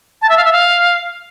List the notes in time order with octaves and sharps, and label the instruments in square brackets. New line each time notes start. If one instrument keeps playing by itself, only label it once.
[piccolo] A5
E5
F5
E5
F5